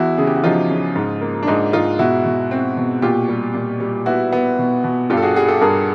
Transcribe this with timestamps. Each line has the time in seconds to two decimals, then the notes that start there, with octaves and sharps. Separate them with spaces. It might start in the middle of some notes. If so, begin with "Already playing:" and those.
Already playing: E2 E4 F#4
0.18 C#3 G#4
0.27 G4
0.36 F#4
0.44 F3 D#4 F4
0.70 C#3
0.96 G#2
1.21 A#3
1.43 D4
1.47 G#2 D#4
1.73 G#2 D#4 F4
1.99 B2 E4 F#4
2.25 B2
2.51 C4
2.77 B2
3.02 A#2 F4 G4
3.28 G3
3.54 A#2
3.80 G3
4.06 B3 E4 F#4
4.32 B3
4.58 B2
4.84 B2
5.10 G2 F4 G4
5.17 A4
5.22 F#4 G#4
5.35 G3 F#4 G#4
5.48 G4 A4
5.61 G2 G#4 A#4